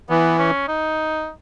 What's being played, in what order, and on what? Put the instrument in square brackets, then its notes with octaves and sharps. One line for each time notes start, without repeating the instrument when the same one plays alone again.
[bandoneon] E3 [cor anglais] B3
[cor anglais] C#4
D#4